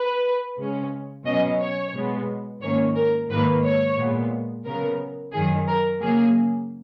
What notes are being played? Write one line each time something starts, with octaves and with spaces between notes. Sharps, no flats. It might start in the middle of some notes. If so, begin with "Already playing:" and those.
Already playing: B4
C#3 G#3 C#4
B2 F#3 C#4 D#5
C#5
B2 G#3 B3
G#2 D#3 A#3 C#4 C#5
A#4
G#2 D#3 A#3 B4
C#5
A#2 G#3 B3
C#3 F#3 B3 A#4
F#2 D#3 F#3 G#4
A#4
C#3 F#3 A#3 G#4